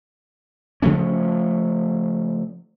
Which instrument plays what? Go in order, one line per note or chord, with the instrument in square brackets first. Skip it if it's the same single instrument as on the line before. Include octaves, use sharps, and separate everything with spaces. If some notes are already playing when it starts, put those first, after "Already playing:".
[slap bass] C#3 F3 A3 C#4